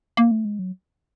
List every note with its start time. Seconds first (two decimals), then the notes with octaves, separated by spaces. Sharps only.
0.17 A#3
0.31 A3
0.45 G#3
0.59 F#3